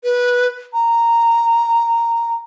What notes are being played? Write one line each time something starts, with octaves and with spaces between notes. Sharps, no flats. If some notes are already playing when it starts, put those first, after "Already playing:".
B4
A#5